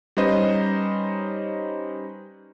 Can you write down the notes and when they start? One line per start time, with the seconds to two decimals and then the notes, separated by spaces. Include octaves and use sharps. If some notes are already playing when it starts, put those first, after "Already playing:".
0.17 G3 C#4 D#4 B4 C5 D#5